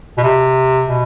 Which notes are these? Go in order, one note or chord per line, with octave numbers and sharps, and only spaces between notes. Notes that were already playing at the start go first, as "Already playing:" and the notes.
B2
C3
B2